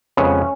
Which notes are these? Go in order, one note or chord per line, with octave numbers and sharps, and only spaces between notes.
F2 C#3 G#3 B3 C#4